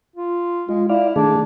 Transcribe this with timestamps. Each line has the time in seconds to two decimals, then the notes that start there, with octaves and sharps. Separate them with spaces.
0.16 F4
0.69 G#3 F4
0.89 E4 D5 F5
1.16 D#3 A3 D4 G#4